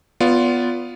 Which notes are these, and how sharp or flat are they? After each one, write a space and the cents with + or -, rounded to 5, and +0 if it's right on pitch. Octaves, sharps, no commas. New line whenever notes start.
B3 +0 F4 +0 D5 -35